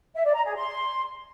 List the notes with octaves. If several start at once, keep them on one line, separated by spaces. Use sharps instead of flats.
E5
D5
A#5
G#4
C6